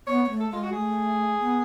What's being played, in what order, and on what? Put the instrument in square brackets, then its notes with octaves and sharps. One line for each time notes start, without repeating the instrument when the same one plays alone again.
[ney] B3 [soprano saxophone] C#5
[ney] B3
A3
[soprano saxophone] A4
[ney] G#3 [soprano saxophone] F4
[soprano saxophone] F#4
[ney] A3 [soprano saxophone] G#4
[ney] B3